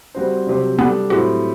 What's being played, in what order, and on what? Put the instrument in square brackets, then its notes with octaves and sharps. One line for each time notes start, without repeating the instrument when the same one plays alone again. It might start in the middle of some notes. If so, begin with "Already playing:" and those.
[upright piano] G3 C4 F#4 C5
C3 F#3 C4 G4 C5
[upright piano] G3 D4 A4 [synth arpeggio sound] B3
[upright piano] A2 F#3 C4 G4 [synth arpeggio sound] F#4